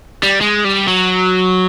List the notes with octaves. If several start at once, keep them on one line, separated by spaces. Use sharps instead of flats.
G3
G#3
G3
F#3